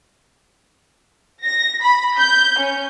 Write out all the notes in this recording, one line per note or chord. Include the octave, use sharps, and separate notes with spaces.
A#6
B5
G6
C#4